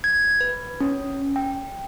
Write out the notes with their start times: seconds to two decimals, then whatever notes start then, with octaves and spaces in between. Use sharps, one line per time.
0.04 G#6
0.41 B4
0.81 C#4
1.36 G5